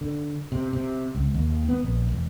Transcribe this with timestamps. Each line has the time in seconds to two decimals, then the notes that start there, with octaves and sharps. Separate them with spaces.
0.01 D3
0.52 C3
0.73 C3
1.15 C#2
1.34 D#2
1.69 B3
1.83 A#1
2.12 E1